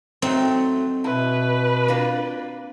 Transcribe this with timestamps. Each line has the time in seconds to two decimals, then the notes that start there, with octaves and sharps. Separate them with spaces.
0.22 F#3 A3 C4 D#4
1.04 B2 E4 B4
1.88 A#3 D4 F4